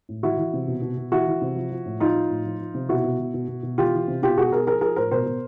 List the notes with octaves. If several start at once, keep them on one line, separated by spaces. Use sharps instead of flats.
A2
E3 E4 F#4
E3
C3
B2
B2
B2
E3 E4 F#4
E3
C3
F3
F3
A2
F3 D#4 F4
F3
A2
F3
F3
C3
B2 E4 F#4
B2
B2
B2
B2
B2
E3 F4 G4
E3
C3
B2 F4 G4
B2 F#4 G#4
B2 G#4 A#4
F3 G#4 A#4
F3 G#4 A#4
A2 A#4 C5
B2 A#4 C5
B2